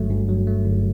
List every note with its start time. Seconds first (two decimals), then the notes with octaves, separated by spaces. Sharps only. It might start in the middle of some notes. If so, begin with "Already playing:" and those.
Already playing: G1 G2 F#3 A3
0.10 G2
0.29 F#3
0.47 A3
0.65 G1